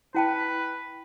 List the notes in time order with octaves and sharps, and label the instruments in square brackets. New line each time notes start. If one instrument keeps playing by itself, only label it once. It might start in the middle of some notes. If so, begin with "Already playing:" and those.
[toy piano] E4 G5 A5 [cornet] B4